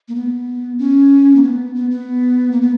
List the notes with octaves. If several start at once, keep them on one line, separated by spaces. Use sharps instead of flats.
A#3
B3
C#4
A#3
B3
B3
B3
A#3
B3